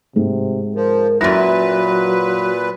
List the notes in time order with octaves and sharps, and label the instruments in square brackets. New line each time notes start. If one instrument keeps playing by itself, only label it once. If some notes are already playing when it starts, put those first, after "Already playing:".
[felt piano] G#2 [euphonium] C3
[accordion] F3 [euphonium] A#4
[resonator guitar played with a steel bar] F#2 E4 [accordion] A#2 B4 [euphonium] F#3 [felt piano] A6 A#6